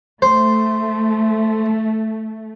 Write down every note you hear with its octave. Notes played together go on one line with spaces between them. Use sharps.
A3 C5